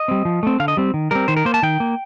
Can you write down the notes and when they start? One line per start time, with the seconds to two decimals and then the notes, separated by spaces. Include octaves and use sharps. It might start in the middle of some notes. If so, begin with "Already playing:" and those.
Already playing: D#5
0.08 G3 C4
0.25 F3
0.43 A3 C4
0.60 D3 F5
0.68 D#5
0.77 G3 C4
0.94 D#3
1.11 G3 C4 A#4
1.28 D#3 C5
1.36 A#4
1.45 A#3 C5
1.54 A5
1.63 D#3 G5
1.80 A#3